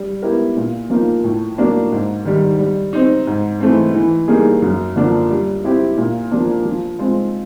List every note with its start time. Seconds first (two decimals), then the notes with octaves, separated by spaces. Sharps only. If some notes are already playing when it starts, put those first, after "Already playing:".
Already playing: G3
0.22 B3 E4 G4 A#4
0.57 A#2
0.90 F3 A#3 D#4
1.24 A2
1.58 F#3 A#3 D4
1.92 G#2
2.25 D#3 G3
2.59 G3
2.93 C4 D#4
3.27 G#2
3.60 E3 A3 C4
3.95 E3
4.28 G3 A#3 D#4 G#4
4.62 F#2
4.96 D3 F3 A#3 D4
5.30 G3
5.64 C4 E4 G4
5.97 A#2
6.31 F3 A#3 D4
6.65 F3
6.99 G#3 C4 F4